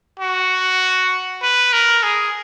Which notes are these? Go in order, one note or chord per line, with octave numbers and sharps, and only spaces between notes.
F#4
B4
A#4
G#4